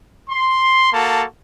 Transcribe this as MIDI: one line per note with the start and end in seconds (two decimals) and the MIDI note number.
0.30 0.91 84
0.93 1.24 58
0.93 1.24 66
0.93 1.24 69
0.93 1.24 81